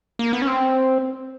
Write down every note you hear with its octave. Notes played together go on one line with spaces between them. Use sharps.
A#3
B3
C#4
C4